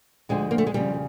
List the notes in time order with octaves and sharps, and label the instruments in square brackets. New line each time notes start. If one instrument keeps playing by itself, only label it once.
[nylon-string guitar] D2 D3 F3 G#3
A#3
A3
G#3
F2 C#3 F3 G3